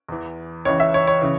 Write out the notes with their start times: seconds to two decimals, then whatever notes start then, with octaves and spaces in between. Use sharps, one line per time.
0.08 E2 E3
0.65 C#2 C#3 E3 C#5
0.80 E5
0.94 C#5
1.07 C#5
1.21 C#3 E3